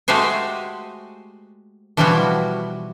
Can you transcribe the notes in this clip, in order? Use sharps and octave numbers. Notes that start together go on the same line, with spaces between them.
G#3 A3 F#4 G4 C5 G#5
B2 E3 F3 G3 E4 F#4